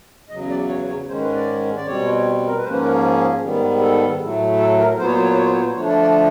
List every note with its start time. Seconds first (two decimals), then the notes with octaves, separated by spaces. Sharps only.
0.29 E2 C#3 F#3 D#5
0.49 D5
0.69 C#5
0.89 C#5
1.08 G#2 D#3 G#3 C#4 C5
1.21 B4
1.34 D5
1.76 D5
1.86 B2 G3 C4 C#5
2.46 A#4
2.56 B4
2.64 G#2 F3 A#3 C#4 C5
2.73 B4
2.84 A#4
2.93 G#4
3.42 G#2 D#3 G3 B3
3.81 A4
4.20 A2 F#3 A3
4.60 A4
4.79 A#4
4.98 A#2 F#3 B3 C5
5.06 C#5
5.13 C5
5.22 C#5
5.30 C5
5.37 C#5
5.45 C5
5.53 C#5
5.60 C5
5.76 D3 F3 A3 D4 C#5
5.89 D5
6.02 D5